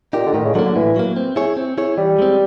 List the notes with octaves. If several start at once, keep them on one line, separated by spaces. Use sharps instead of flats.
A#2 D#4 G4
D3
A2 D#3
C#3
D3 F#3 A#3
D3
A2 E3
F#3 A#3
C4
E4 G#4 C#5
C4
E4 G#4 C#5
E3 G3
G#3 C4